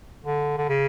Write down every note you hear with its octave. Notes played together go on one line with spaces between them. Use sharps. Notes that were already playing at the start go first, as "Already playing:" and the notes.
D3
D3
C#3